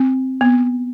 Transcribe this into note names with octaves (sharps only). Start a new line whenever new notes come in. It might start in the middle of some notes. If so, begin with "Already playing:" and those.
Already playing: C4
B3